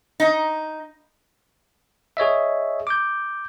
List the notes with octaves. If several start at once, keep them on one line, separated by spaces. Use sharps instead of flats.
D#4
G#4 C#5 D#5 E5
D6 G6